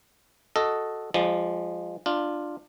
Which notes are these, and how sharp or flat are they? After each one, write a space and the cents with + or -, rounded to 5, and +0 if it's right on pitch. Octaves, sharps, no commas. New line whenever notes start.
F#4 +0 A4 +0 D#5 +0
F3 +0 G#3 -30 D5 +15
D4 +15 F4 +0